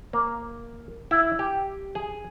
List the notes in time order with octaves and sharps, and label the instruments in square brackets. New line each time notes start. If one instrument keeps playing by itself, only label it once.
[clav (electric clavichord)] A#3
E4
G4
G#4